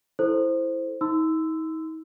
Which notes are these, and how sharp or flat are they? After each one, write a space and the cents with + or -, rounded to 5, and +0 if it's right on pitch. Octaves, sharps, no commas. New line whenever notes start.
E4 +0 A4 +0 C5 +0
D#4 +40 C6 -35 E6 +0